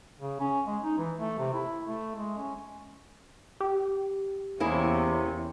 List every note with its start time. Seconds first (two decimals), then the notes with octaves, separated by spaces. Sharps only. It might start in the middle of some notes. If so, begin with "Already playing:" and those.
0.20 C#3
0.40 C#4
0.67 G#3
0.83 D#4
0.98 E3
1.18 A3
1.38 C3
1.54 E4
1.85 A3
2.15 G#3
2.38 C#4
3.60 G4
4.60 E2 C3 A#3 C#4 E4 G#4